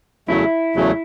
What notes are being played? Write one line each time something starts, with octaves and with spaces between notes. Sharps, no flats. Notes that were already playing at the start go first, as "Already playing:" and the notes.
E2 C#3 F#3 A3 E4
E2 C#3 F#3 A3